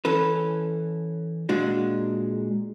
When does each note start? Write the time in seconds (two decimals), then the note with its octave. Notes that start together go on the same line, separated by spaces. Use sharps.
0.05 E3 C#4 A4 B4
1.49 A#2 G#3 D4 F#4